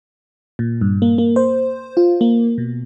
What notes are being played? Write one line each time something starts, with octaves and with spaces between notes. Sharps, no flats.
A#2
G2
A#3
A#3
C5
F4
A#3
B2